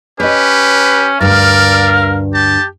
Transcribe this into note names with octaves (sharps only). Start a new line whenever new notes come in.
C#4 G4 B4 C#5 D#5
D2 G2 A#4 D5 F5
G4 A5